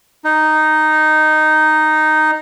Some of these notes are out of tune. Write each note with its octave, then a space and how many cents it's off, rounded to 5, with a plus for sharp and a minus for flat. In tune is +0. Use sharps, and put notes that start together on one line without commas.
D#4 -5